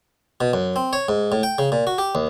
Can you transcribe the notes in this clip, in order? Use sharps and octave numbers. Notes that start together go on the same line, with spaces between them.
B2
F#2
C4
C#5
G#2
A2
G5
C#3
A#2
F#4
G4
D#2